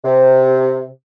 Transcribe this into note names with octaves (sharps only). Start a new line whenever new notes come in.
C3